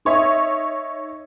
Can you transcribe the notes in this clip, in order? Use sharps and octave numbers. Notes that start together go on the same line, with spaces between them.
D#4 C#5 D#5 E5